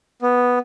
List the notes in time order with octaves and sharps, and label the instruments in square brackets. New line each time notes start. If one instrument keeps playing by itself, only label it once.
[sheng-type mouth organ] B3